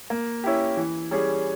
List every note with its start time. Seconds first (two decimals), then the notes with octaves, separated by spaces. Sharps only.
0.10 A#3
0.44 C#4 E4 G4
0.77 E3
1.11 G3 C#4 G#4